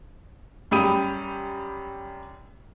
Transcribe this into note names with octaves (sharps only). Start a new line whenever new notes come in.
F#2 G3 G4 B5 D#6 D#7